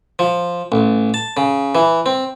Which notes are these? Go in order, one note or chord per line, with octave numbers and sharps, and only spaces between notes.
F3
A1
A5
C#3
E3
C4